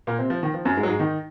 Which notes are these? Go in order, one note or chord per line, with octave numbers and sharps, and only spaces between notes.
A#2 A#3
C3 C4
F3
D#3
F3
F#2 F#3
G#2 G#3
F#3
G#2 G#3
D#3 D#4